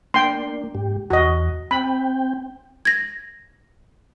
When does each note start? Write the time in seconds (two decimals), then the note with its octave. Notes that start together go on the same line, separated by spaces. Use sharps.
0.14 A#3 D4 G5 C6
0.75 G#2 G4
1.10 E2 F#4 D#5
1.71 C4 G5 B5
2.85 G#6 A#6